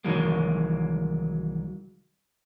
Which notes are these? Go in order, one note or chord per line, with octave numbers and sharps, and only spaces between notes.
C2 D#3 E3 F#3 G#3 A#3